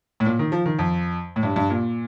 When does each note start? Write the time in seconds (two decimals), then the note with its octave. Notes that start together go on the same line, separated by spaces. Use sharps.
0.20 A2
0.25 A#2
0.39 D#3
0.52 F3
0.66 D#3
0.79 F2
1.36 A2
1.43 G2
1.56 G2
1.70 A#2